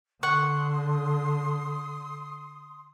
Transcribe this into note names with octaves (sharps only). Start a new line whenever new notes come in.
D3 F#5 C6 C#6 D#6